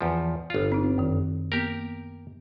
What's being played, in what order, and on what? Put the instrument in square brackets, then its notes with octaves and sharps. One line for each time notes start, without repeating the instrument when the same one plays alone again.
[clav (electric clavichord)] E2 F3
G1 F4
[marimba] C4 D#4
F#2 D#3
[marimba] A#3 B3 [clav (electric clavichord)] G4 A#4